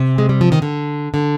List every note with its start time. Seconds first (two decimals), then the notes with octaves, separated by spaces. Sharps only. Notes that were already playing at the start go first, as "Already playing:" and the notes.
Already playing: C3
0.18 G#3
0.29 G3
0.41 F3
0.52 D#3
0.62 D3
1.14 D3